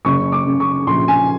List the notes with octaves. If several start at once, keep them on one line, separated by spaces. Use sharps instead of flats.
F#1 C#6
D6
C#3
C#6
A#1 C6
G#5